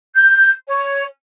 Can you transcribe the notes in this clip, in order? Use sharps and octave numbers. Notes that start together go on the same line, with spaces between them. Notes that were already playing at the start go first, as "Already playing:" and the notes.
G6
C#5